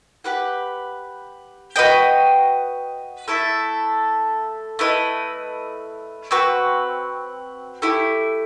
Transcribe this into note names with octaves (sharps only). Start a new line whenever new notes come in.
G4 B4 F#5
F#4 B4 D#5 G5
A3 E4 A4 E5
A3 E4 B4 D#5
C4 F#4 B4
A3 E4 G4